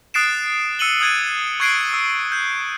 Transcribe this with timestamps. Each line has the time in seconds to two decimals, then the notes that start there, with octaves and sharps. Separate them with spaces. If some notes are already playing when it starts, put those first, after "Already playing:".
0.14 D#6 F#6 A6 C7 D7 E7
0.79 E6 C#7 D#7 F#7 G7
1.01 D#6 F#6 G#6 A6 D#7
1.60 C#6 F#6 G#6 C7 D7 G7
1.93 E6
2.32 F#6 G6